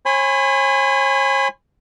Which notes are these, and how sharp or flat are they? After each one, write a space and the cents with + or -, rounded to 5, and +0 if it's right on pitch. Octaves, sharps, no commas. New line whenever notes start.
C#5 -40 G#5 -15 B5 +30